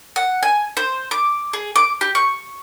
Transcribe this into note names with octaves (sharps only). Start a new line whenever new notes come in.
F#5
G#5
C5
D6
G#4
D6
G4
C#6